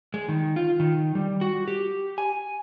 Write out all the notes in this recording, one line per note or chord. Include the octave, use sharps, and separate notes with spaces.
G#3
D#3
F4
D#3
G3
F#4
G4
G#5